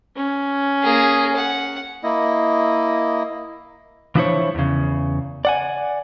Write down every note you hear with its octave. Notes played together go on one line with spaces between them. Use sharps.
C#4
A#3 G#4
F#5
A#3 E4 D#5
E3 F3 D4 E4 C5 C#5
E2 C#3
D5 F#5 G#5